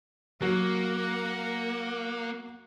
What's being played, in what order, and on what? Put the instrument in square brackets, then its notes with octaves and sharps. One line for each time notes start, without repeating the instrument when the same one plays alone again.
[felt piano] F#3 [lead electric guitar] A#3 [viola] F#5